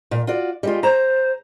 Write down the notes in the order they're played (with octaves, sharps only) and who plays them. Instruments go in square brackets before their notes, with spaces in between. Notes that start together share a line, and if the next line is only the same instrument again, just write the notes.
[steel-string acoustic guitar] A#2
F4 F#4 D5
G3 G#3 F4
[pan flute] C5 [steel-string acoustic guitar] A#5